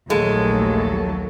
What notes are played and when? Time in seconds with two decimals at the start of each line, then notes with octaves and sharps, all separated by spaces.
0.10 A#1 D#2 F#3 G#3 A3 A4